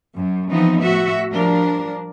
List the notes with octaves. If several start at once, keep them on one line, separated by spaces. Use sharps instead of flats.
F#2
E3 F3 B3 C4 D#4
A2 F#4 E5
F3 G3 D4 A#4